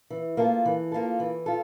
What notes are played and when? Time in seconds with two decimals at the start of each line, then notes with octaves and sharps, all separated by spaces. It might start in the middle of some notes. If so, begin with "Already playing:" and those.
0.10 E3
0.37 A#3 F4 A4
0.65 E3
0.92 A#3 F4 A4
1.20 E3
1.46 F4 A4